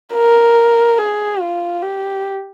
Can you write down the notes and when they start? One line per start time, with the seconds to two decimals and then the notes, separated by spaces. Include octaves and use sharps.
0.14 A#4
0.99 G#4
1.41 F4
1.82 G4